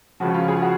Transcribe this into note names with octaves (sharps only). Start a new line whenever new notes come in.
C#2 C#3 F3 F#4
F4
G#4
F#4